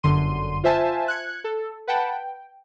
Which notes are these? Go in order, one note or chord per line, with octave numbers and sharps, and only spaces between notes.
G1 F#2 D3 C6 D#7
F4 C5 E5 G#5 A5
F#6 G#6 C#7
A4
B4 F#5 G5 A5 B5
G5